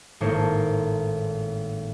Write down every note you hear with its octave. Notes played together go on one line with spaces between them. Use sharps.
G#1 A2 A#3 C5 C#5